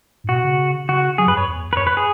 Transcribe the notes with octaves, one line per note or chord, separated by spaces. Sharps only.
G#2
B2 F#4
C#3
C#3 F#4
F#3 G#4
F#2 B4
F#2 C#5
E2
B4
F#2 C#5
B4
G#4